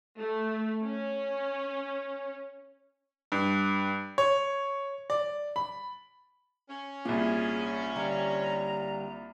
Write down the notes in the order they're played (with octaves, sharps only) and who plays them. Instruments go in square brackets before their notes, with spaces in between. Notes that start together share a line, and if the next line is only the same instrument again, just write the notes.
[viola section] A3
C#4
[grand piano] G2
C#5
D5
B5
[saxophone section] C#4
[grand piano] C2 A#2 [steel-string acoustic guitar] F4 [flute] G#4
[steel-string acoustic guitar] G2 D3 G3 [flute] A#5